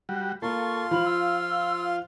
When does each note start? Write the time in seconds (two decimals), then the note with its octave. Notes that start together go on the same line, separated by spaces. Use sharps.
0.09 G3 F#4
0.42 A#3 F4 A4 C6 C#6
0.91 F3 F5 B5
1.05 E6